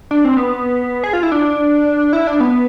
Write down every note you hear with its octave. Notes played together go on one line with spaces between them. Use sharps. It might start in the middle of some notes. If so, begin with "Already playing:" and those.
D4
C4
B3
G#4
F4
E4
D4
E4
D4
B3